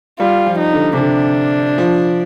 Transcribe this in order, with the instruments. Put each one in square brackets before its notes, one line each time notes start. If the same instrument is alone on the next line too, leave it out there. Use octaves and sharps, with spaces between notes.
[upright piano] G3 [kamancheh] F4
[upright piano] F3
[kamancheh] D#4
[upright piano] D3
C3
[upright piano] D3 [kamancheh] D4
[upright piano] F3